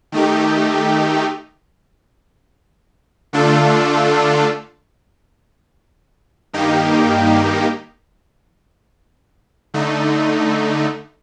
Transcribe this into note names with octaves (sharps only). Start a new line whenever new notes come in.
D#3 A3 D#4 G4
D3 A3 D4 F4 A4
G2 D#3 A#3 D#4 G4
D3 A3 D#4